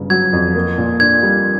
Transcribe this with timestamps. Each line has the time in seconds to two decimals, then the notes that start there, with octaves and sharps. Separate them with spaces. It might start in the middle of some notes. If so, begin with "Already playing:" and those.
Already playing: G1 C#3
0.10 F#3 G#6
0.33 F2
0.55 A#3
0.78 A#2
1.00 D4 G#6
1.23 G3